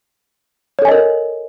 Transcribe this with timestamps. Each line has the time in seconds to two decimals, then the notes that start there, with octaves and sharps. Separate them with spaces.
0.79 C#5
0.82 A4
0.85 G#5
0.88 D#5
0.92 A#4